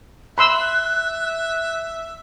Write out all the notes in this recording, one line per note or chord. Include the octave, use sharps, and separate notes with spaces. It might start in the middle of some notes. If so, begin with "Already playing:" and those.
E5 B5 C6 E6 F#6